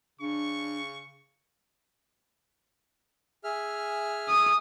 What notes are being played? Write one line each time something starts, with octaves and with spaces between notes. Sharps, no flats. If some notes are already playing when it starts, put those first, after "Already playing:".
C#3 D4 C#6
G#4 E5 F6
D#6